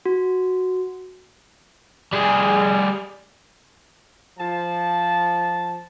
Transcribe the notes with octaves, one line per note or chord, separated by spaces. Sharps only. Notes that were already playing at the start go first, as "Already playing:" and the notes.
F#4
G3 G#4
F3 A5